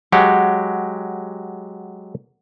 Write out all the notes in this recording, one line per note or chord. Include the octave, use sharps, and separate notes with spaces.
F#3 G#3 G4 F#5